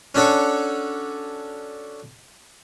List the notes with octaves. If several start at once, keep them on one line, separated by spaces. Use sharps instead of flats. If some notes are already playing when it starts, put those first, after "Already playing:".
C#4 D4 F#4 A4 C#5